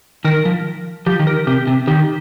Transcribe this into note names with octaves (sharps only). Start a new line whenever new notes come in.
D#3 A#4
F3
F3 G4
D#3
A#4
C3 G4
C3
D#3 G4